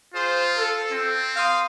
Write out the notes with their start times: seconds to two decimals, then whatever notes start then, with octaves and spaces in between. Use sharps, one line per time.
0.14 F4 G#4 C5
0.57 A4
0.92 C4
1.36 F5 C6 D#6